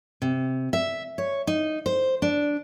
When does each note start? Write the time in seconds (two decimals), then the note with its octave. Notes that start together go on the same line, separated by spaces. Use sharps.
0.22 C3
0.73 E5
1.18 C#5
1.47 D#4
1.86 C5
2.22 D4